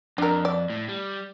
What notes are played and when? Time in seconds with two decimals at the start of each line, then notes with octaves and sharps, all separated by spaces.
0.18 F2 D4 A#4
0.45 D5
0.70 A2
0.89 G3